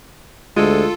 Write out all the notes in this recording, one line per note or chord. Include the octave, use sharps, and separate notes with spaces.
D2 G#3 F4 A4